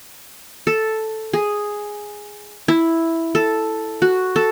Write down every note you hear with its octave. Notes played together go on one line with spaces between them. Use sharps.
A4
G#4
E4
A4
F#4
A4